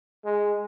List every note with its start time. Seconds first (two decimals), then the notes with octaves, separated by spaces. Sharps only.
0.25 G#3